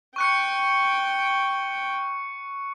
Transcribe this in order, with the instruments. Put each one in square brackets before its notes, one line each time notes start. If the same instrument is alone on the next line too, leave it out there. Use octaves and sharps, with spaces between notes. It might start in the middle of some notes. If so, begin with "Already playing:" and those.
[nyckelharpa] G5 [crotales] C#6 F#6 C#7